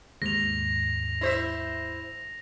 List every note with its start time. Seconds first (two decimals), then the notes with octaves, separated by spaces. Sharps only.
0.22 D#2 G#2 A#6 F7
1.21 E4 C5 E5